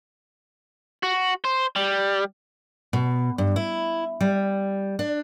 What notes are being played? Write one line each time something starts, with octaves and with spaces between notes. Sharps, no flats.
F#4
C5
G3
B2
G2
E4
G3
D4